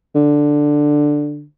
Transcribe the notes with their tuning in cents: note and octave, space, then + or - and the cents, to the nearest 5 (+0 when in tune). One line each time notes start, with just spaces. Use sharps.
D3 +5